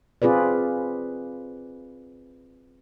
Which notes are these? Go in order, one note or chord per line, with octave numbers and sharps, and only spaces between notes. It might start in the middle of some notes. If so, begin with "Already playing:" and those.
C4 F4 G#4 B4 D5